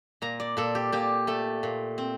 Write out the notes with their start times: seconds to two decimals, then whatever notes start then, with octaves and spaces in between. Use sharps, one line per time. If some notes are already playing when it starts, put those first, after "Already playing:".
0.22 A#2 A#5
0.40 D5
0.57 A#2 A4
0.75 G4
0.92 A#2 G4
1.27 A3 A4
1.63 A#2
1.98 C4